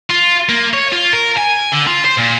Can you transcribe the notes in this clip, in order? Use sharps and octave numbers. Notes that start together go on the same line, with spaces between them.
F4
A#3
C#5
F4
A#4
G#5
D3
F4
C5
A#2